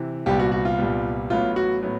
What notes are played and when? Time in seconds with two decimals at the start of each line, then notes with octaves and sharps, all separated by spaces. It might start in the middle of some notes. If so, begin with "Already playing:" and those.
Already playing: C3 E3
0.26 C2 A#2 G3 B3 G4
0.39 F#4
0.52 F#4
0.65 F4
0.78 C2 A#2 G3 B3
1.30 A1 A2 F#3 B3 F4
1.56 F#4
1.83 A2 F#3 B3